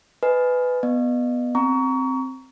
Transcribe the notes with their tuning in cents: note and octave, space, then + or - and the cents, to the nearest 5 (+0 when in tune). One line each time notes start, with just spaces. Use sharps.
B4 +15 D#5 +0 G#5 +10
B3 +0 D#5 -35
C4 +0 A#5 +0 C#6 +30